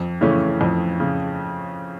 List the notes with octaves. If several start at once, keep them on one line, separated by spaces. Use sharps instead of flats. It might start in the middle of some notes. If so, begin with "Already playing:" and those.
Already playing: F2
C#3 E3 A3 C#4
F2
C#3